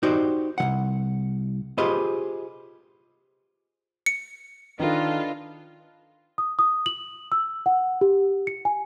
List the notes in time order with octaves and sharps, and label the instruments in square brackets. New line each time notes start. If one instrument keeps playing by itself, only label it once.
[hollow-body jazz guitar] D#4 F#4 G4 C5 D5
C2 D#3 F#5
F4 G4 G#4 B4 C5 D#5
[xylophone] C#7
[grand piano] D#3 [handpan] D4 B4 D#5 [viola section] F4 A4 F5
[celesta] D#6
D#6
F#7
E6
F#5
G4
C#7
G#5